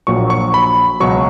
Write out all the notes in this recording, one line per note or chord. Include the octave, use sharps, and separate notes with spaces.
A#1 A#2 F#3 C#6
C#6
B5
C#2 B2 F#3 C#6